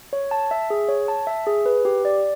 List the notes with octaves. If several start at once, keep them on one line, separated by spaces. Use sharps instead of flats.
C#5
A5
E5
G#4
C#5
A5
E5
G#4
B4
G4
D5